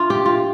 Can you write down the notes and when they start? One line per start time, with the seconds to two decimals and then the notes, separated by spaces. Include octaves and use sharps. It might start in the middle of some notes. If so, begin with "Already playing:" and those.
Already playing: D4 F4
0.10 G4
0.26 F4